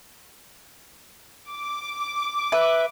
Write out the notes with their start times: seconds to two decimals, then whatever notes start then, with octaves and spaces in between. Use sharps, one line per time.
1.50 D6
2.52 B4 E5